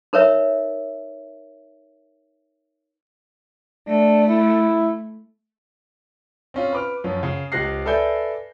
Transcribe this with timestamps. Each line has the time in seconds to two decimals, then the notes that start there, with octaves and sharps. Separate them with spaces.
0.13 D#4 A#4 B4 C#5 E5
3.87 A3 D4
4.28 E4
6.54 C4 C#4 F4
6.73 B4 D6 F6
7.04 F#2 F3 C#4
7.23 C#3
7.52 C#2 G4 C5 F#6 A#6 C7
7.86 A4 B4 D5 E5 G#5 G6